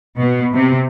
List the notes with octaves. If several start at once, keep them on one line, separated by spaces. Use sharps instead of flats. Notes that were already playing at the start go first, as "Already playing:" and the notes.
B2
C3